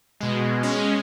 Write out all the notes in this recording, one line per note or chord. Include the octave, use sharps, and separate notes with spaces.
B2 G#3
G#3 C#4